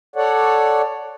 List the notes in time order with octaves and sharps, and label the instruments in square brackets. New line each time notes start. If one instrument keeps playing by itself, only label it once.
[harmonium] A4 C#5 D5 F#5